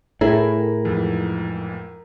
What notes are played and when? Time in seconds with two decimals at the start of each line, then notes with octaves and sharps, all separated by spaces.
0.21 A2 E4 G#4 A#4
0.85 F2 G#2 E3